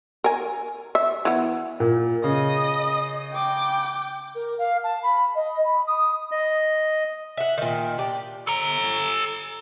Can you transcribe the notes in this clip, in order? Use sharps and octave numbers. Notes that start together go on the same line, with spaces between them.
A#4 G#5
E5
E3 B3
A#2
C#3 D#5 D#6
G5 D6
A#4
F5
A5
B5
D#5
B5
D#6
D#5
E5 F#5
A#2 D#3
D4 G4
A4 A#5